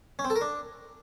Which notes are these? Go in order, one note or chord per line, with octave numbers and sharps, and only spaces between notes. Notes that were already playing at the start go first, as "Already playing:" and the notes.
C#4
C4
A4
A#4
D4